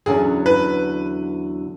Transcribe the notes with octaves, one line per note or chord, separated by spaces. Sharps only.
E2 D3 F#3 C#4 G#4
B4